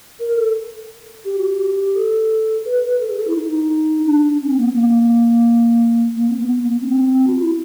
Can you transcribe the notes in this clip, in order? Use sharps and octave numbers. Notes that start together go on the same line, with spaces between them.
A#4
A4
G4
F#4
G4
A4
B4
B4
A4
G#4
A4
E4
D#4
D4
C#4
C4
A#3
B3
A#3
A#3
C4
B3
B3
A#3
B3
C#4
C4
F#4
F4
E4